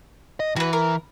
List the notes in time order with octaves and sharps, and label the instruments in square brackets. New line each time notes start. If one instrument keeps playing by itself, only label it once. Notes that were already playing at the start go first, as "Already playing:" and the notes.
[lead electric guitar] D#5
[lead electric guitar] E3 [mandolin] F#4 B4
[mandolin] A#4